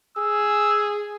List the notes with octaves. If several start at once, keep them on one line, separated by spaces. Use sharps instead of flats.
G#4 E6